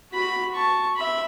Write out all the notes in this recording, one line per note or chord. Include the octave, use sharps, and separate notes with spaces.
F#4 B5
A5 C#6
E5 B5